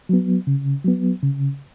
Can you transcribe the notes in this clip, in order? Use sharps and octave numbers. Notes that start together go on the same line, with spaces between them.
F#3 B3
C#3
F#3 B3
C#3